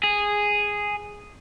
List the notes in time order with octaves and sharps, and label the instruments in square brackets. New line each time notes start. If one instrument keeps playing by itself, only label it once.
[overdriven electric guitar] G#4